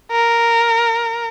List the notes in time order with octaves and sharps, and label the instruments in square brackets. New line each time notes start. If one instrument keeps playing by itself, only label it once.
[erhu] A#4